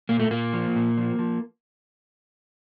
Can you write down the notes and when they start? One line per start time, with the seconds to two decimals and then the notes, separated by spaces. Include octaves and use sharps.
0.09 A#2 A#3
0.20 A3
0.30 A#2 A#3
0.53 F3
0.76 A#2
0.98 F3
1.19 F3